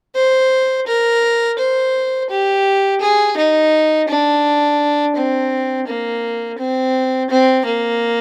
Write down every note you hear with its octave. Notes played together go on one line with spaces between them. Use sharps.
C5
A#4
C5
G4
G#4
D#4
D4
C4
A#3
C4
C4
A#3